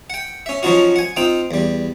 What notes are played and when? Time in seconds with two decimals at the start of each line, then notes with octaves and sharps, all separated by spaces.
0.10 F#5 G5
0.46 C#4 E5
0.63 F3 F#3 C#4 D#4 F4 F#4
0.96 F#5 G#5
1.17 C4 D#4 F4 G5
1.51 E2 G3